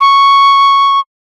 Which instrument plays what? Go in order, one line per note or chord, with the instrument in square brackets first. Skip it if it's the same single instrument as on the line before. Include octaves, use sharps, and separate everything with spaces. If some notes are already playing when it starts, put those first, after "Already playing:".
[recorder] C#6